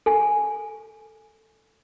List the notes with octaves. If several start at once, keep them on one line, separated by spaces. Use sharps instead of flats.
A4 G#5